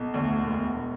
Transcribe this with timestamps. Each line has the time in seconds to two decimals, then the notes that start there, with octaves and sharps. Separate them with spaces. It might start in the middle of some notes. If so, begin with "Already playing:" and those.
Already playing: B1
0.14 D2
0.44 E1